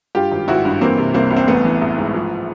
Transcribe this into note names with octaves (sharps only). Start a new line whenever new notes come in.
G2 F4 G4
G#1
G#1 E4 F#4
G2
E3 A#3 C4
C3
C2 A#3 C4
C2
C4
A1 A3 B3
E3
A1
G#2
F3